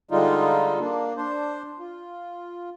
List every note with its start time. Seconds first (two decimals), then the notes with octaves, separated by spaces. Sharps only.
0.11 D3 G3 G#3 D#4 F4
0.80 A#3 D4
1.17 D4 C5
1.79 F4